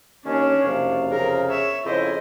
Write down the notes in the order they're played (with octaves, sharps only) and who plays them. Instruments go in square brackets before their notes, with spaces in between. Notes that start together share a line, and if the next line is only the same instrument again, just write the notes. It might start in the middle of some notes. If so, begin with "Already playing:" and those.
[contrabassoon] D#2 [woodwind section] C#4 [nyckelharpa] D4 C#5
[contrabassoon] F#1 [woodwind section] F2 C3 F5
[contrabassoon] C#3 [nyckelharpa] A#4
[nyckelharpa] C#5 E5
[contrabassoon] F2 [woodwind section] C#3 E4 [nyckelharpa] C5 D#5